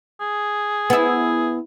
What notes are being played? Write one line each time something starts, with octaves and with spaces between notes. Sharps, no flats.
G#4
B3 E4